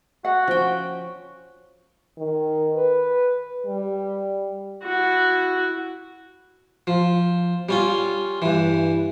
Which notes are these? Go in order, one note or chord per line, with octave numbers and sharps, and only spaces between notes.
F#4 F#5
F3 C#4 G5
D#3
B4
G3
E4 F#4
F3
G3 C#4 F4
G2 E3